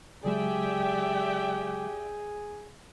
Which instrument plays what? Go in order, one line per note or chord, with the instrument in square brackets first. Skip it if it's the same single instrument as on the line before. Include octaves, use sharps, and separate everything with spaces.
[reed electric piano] C#3 F#3 G#3 [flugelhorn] G4 [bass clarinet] G#4 [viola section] D5 E5 G5